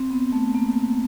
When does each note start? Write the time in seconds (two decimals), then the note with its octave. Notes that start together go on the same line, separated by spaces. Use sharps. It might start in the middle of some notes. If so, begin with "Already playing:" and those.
Already playing: C4
0.11 B3
0.32 A3
0.55 A#3